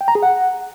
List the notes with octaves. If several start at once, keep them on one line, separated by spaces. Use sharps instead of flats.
G5
A#5
G#4
F#5